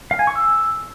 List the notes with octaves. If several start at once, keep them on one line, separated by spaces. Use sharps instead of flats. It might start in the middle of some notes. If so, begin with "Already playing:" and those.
F5
G#5
C#6
E6